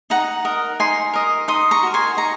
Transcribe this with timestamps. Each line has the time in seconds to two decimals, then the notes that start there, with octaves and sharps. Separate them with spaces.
0.10 D#4 F#5 A#5
0.45 A#4 D#5
0.80 D#4 G#5 C6
1.13 A#4 D#5
1.48 D#4 C6 D#6
1.71 A#5 C#6
1.83 F#4 A#4
1.94 G#5 C6
2.17 D#4 A#5 C#6